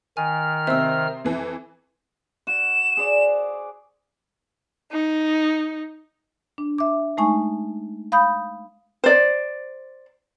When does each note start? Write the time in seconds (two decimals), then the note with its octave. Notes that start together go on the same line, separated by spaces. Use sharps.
0.17 D#3 G#5 F6
0.67 C3 C4 E5 E6
1.24 F2 E3
2.47 F#4 E7
2.97 G#4 C5 D5
4.92 D#4
6.58 D4
6.78 E5 D6
7.17 G#3 A3 D#4 G#5 C#6
8.12 F5 B5 D#6 G6
9.04 C5 D5